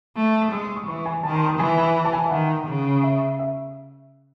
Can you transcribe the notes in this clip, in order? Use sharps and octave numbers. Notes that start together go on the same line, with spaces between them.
A3
D#6
G#3 E6
D#6
C#6
E3 C#6
G#5
D#3 A5
C6
D#6
E3 G#5
G#5
A5
G#5
E5
D#3 F#5
C#3
E5
E5